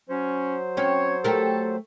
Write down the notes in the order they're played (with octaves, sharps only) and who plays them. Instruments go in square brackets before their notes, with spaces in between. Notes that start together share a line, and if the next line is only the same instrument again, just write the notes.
[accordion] F#3 C5 [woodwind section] C#4
[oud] C4 C#4 [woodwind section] C#5
[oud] A3 G4 A#4 [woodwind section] A4